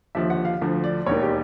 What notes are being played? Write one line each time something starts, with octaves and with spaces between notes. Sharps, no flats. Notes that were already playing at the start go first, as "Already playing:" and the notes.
D#2 D3 F3 E5
F#5
F5
D2 D3 F3
D5
E1 D#2 D#3 C#5
G4